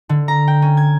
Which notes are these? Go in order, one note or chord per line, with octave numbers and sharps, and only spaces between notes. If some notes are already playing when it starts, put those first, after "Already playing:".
D3
A#5
G5
C#4
G#6